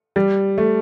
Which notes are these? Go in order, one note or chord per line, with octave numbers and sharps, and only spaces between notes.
G3
A3